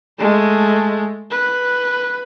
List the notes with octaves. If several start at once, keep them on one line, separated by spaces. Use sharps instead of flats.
G#3 A3
B4